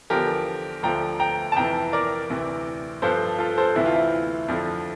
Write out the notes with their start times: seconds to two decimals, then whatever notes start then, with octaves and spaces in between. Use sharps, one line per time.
0.10 E2 D3 F3 G4 A#4
0.83 D2 D3 F3 G5 A#5
1.20 G5 A#5
1.52 A5
1.56 F2 C3 E3 G5 A#5
1.93 A#4 D5
2.30 D2 C3 E3
3.02 G2 F3 A4 C5
3.39 F4 A4
3.57 A4 C5
3.76 D2 C3 E3 E4
3.86 F4
3.95 E4
4.48 F2 D3 F3